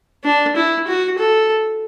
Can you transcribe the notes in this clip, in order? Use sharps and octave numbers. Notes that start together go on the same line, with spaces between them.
D4
E4
F#4
A4